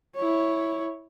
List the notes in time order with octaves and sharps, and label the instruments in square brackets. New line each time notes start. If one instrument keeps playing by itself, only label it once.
[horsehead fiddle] E4 C#5